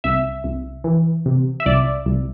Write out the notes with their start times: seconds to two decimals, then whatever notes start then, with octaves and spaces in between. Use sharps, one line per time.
0.04 C2 E5
0.44 C2
0.84 E3
1.26 C3
1.60 E5
1.66 C2 D5
2.06 C2